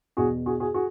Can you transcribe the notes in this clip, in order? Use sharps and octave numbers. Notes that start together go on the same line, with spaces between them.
E2 B2 F#4 G#4
F#4 G#4
F#4 G#4
F#4 G#4